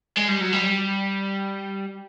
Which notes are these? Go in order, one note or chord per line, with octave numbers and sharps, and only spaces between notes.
G#3
G3
F#3
G3